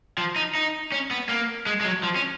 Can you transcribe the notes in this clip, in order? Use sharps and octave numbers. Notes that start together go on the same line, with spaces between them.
F3
D#4
D#4
C#4
B3
A#3
G#3
G#3
F#3
F3
C#4